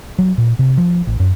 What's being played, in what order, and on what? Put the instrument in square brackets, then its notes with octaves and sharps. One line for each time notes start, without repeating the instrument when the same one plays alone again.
[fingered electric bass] F#3
A#2
C3
F3
A1
F#2